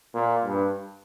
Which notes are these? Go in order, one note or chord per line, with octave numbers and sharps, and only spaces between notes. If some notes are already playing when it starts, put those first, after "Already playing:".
A#2
G2